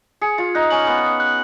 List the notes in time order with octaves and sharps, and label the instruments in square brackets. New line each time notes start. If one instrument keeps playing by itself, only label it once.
[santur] G#4 [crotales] C#7
[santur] F4 [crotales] C#7
[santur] D#4 [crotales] F#6
[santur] C#4 [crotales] F#7
[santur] B3 [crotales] F#6
[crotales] F#6
F#6